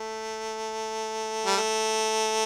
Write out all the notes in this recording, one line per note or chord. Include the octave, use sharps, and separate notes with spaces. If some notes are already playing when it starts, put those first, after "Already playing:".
Already playing: A3
G3
A3